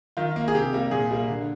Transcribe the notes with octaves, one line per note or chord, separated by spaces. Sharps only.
D#3 F4
A#3
G#4
C3 G4
G3 A#3
A#2 G#4
G3 A#3
D3